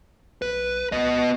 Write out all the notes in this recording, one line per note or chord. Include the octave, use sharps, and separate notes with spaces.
B1 B4
C#2 B3 D#5